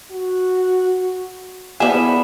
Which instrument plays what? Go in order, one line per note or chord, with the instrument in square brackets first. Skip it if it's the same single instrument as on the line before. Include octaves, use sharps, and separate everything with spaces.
[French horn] F#4
[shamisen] F3 G3 G#4 [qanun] B3 E5 [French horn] E4